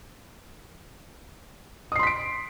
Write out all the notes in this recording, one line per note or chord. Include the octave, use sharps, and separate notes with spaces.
C6 D#6 B6 C7 D7